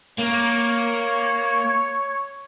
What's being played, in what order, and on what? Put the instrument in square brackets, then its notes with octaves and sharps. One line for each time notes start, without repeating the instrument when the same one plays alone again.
[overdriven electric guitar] A#3 [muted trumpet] C#5